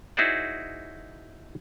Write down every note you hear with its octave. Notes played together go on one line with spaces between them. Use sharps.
D#4 E4 F#4 G#4 C5 D5